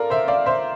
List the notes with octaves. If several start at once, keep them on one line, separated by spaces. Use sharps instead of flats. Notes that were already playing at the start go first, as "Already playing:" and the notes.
Already playing: F4 A4 A#4 D5
C5 E5
D5 F5
C5 E5